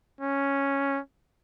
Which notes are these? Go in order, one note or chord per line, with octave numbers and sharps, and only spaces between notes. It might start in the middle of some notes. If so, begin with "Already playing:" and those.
C#4